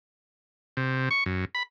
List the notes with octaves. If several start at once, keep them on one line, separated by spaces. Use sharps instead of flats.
C3
C#6
F#2
B5